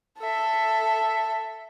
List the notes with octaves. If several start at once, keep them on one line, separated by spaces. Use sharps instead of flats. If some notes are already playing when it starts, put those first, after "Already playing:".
A4 E5